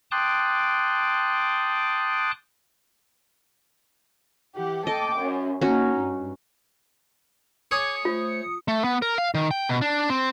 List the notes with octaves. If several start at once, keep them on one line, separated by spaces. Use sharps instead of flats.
G5 A5 C6 D6 D#6 F#6
E3 G4 F#5
A4 D#5 G5 D6
F#2
A#3 C#4 D#4 F#4
G2
G#4 C#5 D6 D#6 G#6 C#7
A3 F4 C5
A3
B3
A#4
F5
D#3
G5
B2
D4
C4